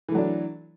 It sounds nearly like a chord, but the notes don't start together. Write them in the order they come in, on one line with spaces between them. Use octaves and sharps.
E3 A3 F#3 D4